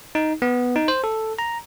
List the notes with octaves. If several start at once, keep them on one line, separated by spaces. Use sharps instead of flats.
D#4
B3
D#4
C5
A4
A#5